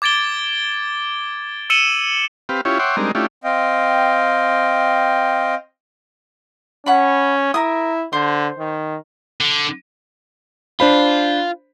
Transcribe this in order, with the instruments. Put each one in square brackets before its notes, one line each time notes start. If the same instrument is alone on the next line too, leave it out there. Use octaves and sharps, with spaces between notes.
[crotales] D6 G#6 A6 D7 G7
E6 C#7 D#7 E7 F#7 G7
[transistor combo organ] C4 G4 B4 F5
C#4 E4 F4 G4 C#5
C#5 E5 F#5 G5 C6 D6
G3 G#3 C4 D4 D#4 A#4
A3 C#4 D4 E4 F4 G4
[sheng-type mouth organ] C4 D#5 F5 G5
[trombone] C#4 [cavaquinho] F#5 B5
[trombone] E4 [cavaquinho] A#4 D#6
[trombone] D3 [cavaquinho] C5
[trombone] D#3
[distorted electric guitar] D3
[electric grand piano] D4 C5 B5 [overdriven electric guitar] F4